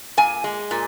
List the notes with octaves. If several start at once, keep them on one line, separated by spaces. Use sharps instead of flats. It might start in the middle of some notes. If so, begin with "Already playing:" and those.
A#2 G#5
G#3
A#2